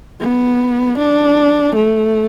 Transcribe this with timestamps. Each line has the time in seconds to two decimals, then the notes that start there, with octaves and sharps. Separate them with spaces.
0.20 B3
0.98 D4
1.76 A3